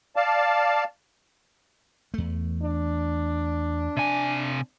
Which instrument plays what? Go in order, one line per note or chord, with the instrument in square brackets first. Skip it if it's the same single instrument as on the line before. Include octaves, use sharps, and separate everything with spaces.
[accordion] D5 F5 A5
[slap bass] E2 A3
[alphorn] D4
[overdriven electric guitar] C3 G#5